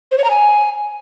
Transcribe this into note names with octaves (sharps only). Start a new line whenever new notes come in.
C5
C#5
A#5
G#5